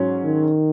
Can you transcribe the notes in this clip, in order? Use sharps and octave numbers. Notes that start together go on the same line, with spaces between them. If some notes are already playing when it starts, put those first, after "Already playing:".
Already playing: G#2 F#3 C#4
D#3